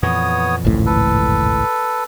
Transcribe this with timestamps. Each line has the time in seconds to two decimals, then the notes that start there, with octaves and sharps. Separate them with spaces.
0.03 F2 A#2 E3 B3 C#5 D#6
0.65 G#1 C#2 A2
0.86 A4 B4